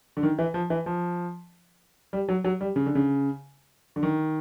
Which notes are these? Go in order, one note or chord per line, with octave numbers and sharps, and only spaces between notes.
D3
D#3
E3
F3
E3
F3
G3
F#3
F#3
G3
C#3
D3
C#3
D3
D#3